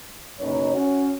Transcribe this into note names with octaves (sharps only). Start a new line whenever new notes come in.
F#1 F#2 B2 D#4 C#5
C#4 F#4 C#5